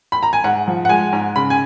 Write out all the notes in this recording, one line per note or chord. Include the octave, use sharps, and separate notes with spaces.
B5
A#5
G#5
G#2 F#5
F3
F#5
G#3 G#5
G#2
C#3 B5
G#5